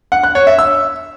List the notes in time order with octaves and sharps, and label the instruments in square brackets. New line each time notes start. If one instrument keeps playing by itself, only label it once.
[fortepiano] F#5
F#6
C#5
E5
E6